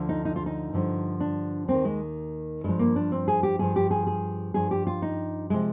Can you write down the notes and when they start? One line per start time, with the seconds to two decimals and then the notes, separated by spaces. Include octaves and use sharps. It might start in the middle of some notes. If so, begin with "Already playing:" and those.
Already playing: D2 D3 F3
0.09 D#4
0.25 D#4
0.36 F4
0.46 D#4
0.73 G2 D3 F3
1.20 D4
1.68 D#2 D#3 C4
1.85 G#3
2.64 G2 F3 G#3
2.79 A#3
2.96 D4
3.12 C4
3.28 G#4
3.43 G4
3.59 G2 F3 G#4
3.76 G4
3.91 G#4
4.07 G#4
4.54 G2 F3 G#4
4.71 G4
4.87 F4
5.02 D#4
5.50 C3 F3 G#3